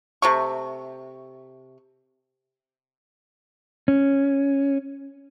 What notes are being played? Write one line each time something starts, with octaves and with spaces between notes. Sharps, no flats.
C3 A3 C#6
C#4